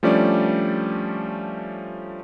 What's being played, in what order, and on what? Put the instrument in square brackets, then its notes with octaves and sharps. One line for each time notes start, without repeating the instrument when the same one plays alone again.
[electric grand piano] F3 G3 A3 C#4 D4 D5